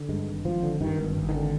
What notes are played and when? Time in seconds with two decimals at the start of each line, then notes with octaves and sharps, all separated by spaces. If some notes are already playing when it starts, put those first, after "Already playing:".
Already playing: D3
0.09 G2 G#3
0.27 G#1
0.45 G#1 F3
0.63 D3
0.81 G2 D#3
0.99 G#1
1.17 G#1
1.29 D#3
1.35 D3